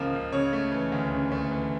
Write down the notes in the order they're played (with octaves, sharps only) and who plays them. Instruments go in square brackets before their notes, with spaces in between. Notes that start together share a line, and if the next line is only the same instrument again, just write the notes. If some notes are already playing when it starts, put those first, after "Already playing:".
Already playing: [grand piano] C#2 C#3 F3 A#3
C#2
C#3 C#5
A3
E3
D2
C#3
A3
E3